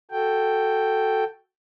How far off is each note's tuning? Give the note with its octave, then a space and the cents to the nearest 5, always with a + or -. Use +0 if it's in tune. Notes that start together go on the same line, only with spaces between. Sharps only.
F#4 +0 A4 +0 G5 +0